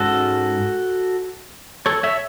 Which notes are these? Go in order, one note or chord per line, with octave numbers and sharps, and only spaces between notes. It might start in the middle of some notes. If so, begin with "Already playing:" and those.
Already playing: G#2 G#3 C#4 F#4 A4
A4 C#5
C#5 E5